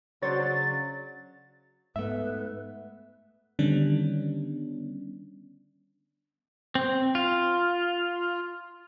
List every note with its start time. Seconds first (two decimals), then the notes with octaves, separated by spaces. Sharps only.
0.22 C#3 F#3 D4 C5 C#5 A6
1.96 G#2 A3 B3 B4 E5
3.59 D3 D#3 G3 B3 C#4 D4
6.75 C4
7.15 F4